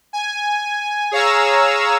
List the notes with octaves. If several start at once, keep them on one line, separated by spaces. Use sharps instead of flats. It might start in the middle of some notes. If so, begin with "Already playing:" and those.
G#5
G#4 C#5 F5 A#5 E6